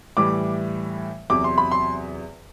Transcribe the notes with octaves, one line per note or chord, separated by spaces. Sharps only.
A2 E3 G3 D6
E2 C3 F#3 D6
C6
B5
C6